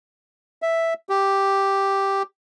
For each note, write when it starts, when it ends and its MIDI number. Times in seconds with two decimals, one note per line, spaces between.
0.62 0.94 76
1.09 2.23 67